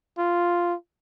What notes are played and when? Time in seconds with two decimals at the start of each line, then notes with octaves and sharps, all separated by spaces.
0.18 F4